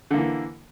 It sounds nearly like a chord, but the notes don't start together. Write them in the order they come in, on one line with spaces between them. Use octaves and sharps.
D3 A#3 E3